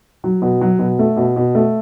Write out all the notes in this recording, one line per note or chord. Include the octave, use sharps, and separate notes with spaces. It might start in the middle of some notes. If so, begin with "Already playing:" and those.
F#3
B2
F#3
B2
A3
B2
B2
A3